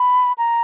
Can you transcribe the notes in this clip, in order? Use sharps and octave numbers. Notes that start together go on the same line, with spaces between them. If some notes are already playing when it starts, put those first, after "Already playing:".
Already playing: B5
A#5